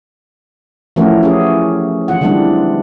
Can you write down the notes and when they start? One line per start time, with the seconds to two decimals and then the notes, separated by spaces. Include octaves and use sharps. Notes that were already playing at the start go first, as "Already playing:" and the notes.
0.96 E3 F3 A3 C#4 F#4 A#4
1.23 C#4 G4 G#4
2.08 E3 F4 F#5
2.21 D3 E3 G3 G#3 C4 D4